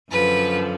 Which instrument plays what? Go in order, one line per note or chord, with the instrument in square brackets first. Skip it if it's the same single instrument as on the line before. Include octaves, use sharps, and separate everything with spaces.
[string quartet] F#2 D3 F3 B4